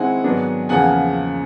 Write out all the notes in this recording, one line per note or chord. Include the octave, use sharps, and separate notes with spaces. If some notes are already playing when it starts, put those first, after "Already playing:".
Already playing: D#3 G#3 C4 E4 F#5 G#5
G#2 D#3 F#3 B3 D4
E2 C#3 F3 A#3 F#5 G#5